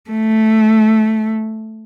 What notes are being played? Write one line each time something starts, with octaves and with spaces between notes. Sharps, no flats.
A3